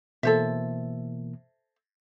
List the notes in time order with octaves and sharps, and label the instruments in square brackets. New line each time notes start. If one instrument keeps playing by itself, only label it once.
[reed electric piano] B2 E3 A#3 [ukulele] A4 C5 E5